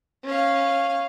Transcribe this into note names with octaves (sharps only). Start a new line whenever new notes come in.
C#4 F5